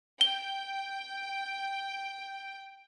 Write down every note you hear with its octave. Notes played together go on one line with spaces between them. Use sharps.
G5 G7